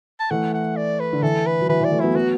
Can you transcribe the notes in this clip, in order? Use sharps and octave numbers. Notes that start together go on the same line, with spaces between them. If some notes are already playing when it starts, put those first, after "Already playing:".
A5
E3 A3 F#5
F#5
D5
B4
D3
E3 A4
B4
F#3
E3 B4
E3
D5
E3 A3
F#3 B3 E4
F#3 B3 F#4